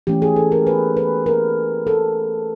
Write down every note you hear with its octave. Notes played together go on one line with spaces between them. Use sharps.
E3 A3 C#4 G4
G#4
A4
A#4
B4
B4
A#4
A4